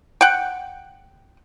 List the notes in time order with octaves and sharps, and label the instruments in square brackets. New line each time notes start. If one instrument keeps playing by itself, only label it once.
[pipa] F#5 G5